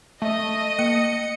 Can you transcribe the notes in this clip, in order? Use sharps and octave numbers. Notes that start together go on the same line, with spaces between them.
A3 D#5
A#3 C#7